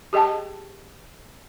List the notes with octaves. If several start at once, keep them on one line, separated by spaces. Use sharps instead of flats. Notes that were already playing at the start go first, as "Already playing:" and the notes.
G4 G#4 D#5 G5 A5